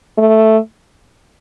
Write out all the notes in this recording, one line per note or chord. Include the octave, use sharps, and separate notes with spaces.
A3